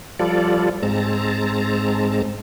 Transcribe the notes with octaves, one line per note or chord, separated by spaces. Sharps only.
F3 G3 F4 A4 D5
G#2 G#3 C4 A5 A#5